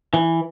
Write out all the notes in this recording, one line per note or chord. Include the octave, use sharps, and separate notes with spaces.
E3